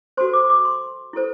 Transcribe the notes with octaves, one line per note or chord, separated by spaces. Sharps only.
F#4 A4 C5 C6
D6
D6
C6
E4 A4 C5